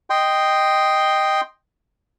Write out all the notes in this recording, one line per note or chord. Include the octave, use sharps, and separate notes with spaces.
D#5 G5 C6